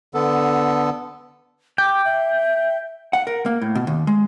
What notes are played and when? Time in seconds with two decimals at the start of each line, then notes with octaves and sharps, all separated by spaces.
0.14 D3 B3 A4
1.78 G5 D6
2.05 E5
3.13 F#5
3.27 A#4
3.46 A#3
3.62 A2
3.75 B2
3.87 D#2
4.07 G#3